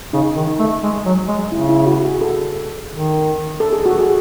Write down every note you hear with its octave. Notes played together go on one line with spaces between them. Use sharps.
C#3 D#4
D#3
D#4
A3
G#3
F#3
G#3
C#3 E4
E4
F#4
G#4
A4
D#3
A4
G#4
F#4
G#4